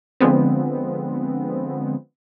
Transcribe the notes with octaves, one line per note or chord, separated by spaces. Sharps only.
D3 F3 G#3 B3 C4